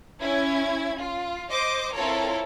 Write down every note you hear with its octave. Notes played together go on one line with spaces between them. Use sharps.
C#4 E4 G#6
F4
C5 D#5 D6
C4 E4 F4 A4 A#4 C#5